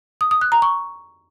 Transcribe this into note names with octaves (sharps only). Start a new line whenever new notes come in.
D#6
D#6
F#6
A#5
C#6